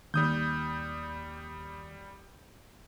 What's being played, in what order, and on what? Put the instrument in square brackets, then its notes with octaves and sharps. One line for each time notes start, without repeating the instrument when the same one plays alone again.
[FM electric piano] D#2 [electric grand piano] G3 D#6 G6